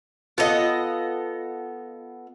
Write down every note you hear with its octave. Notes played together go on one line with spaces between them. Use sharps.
B3 F4 A4 D#5